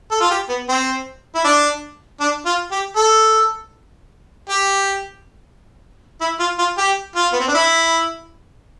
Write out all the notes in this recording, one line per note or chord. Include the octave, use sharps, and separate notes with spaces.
A4
F4
G4
B3
C4
E4
D4
D4
F4
G4
A4
G4
E4
F4
F4
G4
F4
B3
C4
D4
E4